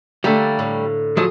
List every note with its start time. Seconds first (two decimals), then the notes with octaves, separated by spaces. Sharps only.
0.24 D3 G3 A3 A#3
0.59 A2
1.17 F3 F#3 G#4